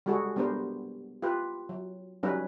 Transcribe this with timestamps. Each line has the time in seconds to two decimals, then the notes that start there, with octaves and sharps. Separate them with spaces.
0.06 G3 G#3 F#4 G#4 A4
0.36 G3 B3 D4 A#4 C5
1.22 F4 G4 B4
1.69 F#3
2.23 F#3 G3 C#4 D#4 B4